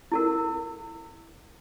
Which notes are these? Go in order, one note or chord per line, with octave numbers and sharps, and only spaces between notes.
E4 A4 A#4